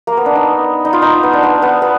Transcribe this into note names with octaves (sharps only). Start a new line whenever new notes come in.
A#3
B3
D4
D#4
D#4
F4
D#4
B3
D4
B3
B3
B3